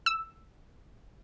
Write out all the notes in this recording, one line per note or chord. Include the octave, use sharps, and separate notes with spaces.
E6